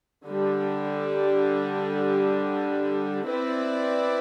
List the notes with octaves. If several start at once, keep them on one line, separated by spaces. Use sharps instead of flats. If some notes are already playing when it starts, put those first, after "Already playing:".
D3 G3 D4
C4 E4 B4 D5